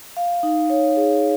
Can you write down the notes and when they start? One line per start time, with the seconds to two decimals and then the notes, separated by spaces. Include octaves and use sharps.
0.17 F5
0.43 D#4
0.70 C#5
0.96 G#4